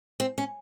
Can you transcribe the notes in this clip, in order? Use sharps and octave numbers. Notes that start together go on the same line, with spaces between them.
C4
C#4